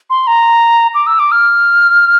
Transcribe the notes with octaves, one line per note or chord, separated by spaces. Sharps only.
C6
A#5
D6
E6
D6
F6